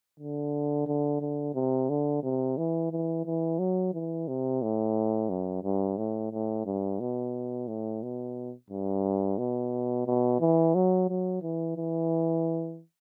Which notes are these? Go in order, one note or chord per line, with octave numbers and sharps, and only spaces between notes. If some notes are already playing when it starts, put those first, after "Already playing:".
D3
D3
D3
C3
D3
C3
E3
E3
E3
F#3
E3
C3
A2
F#2
G2
A2
A2
G2
B2
A2
B2
G2
B2
B2
E3
F#3
F#3
E3
E3